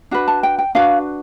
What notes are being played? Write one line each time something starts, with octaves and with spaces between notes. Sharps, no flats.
D4 F#4 B4
A5
G5
G5
D4 F#4 B4 F5